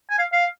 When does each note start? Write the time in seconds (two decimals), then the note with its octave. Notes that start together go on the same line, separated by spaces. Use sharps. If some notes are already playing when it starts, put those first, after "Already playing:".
0.10 G#5
0.19 F5
0.32 F5